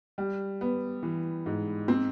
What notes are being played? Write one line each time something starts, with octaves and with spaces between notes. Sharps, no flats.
G3
B3
E3
G#2
C4